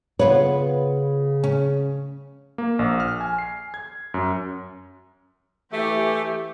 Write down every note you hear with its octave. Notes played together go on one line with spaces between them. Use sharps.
C#3 B3 F4 B4 C#5
C#4
A#3
A#1
F6
G#5
C7
G#6
F#2
E3 A3 G4 E5